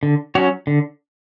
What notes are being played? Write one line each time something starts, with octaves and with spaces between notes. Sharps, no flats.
D3
F#3 C#4 F#4 C#5
D3